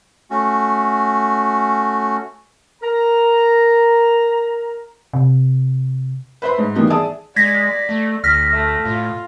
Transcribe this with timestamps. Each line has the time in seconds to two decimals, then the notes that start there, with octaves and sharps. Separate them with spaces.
0.31 A3 C#4 F#4
2.82 A#4 A#5
5.13 C3
6.42 B4 C5 E5 B5 C6
6.58 G#2
6.75 D#3 E3 G3 A#3 B3 D#4
6.90 G#4 D5 E5 A5 D#6
7.36 G#3 D5 G#6 A#6 B6
7.89 A3
8.24 D2 F6 A#6 B6
8.53 A3
8.85 A2 F4